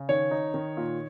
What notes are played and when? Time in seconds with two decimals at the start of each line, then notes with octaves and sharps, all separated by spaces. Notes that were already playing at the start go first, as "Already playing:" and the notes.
Already playing: C#3
0.09 D#3 C#5
0.31 D#4
0.54 D#3
0.77 A#2